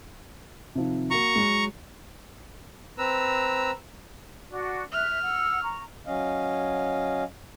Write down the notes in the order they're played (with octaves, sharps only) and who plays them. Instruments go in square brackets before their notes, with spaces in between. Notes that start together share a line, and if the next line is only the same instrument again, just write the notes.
[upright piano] C3 D#3 F3
[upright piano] A#3 F#4 [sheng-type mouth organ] A#5 C#6
[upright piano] F#3 G#3
[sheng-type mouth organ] C4 B4 A#5 E6
[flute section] D4 F#4
[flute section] E5 F#6 [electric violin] F6
[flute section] F#5 E6
A#5 C#6
[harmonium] F#3 C#4 D#5 F5